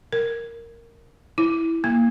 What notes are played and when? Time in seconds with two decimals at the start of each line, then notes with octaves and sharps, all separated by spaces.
0.13 A#4
1.38 E4
1.84 A#3